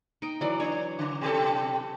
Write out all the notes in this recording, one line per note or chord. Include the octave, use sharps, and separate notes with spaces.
D#4 G5
E3 F#3 D5
D4 C#5
C#3
B2 G4 A4